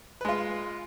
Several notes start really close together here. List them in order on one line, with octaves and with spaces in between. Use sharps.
B4 G#3 F4